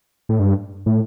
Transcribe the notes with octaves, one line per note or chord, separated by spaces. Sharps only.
A2
G2
A2